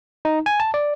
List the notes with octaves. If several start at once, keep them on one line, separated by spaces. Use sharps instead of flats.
D#4
G#5
A5
D5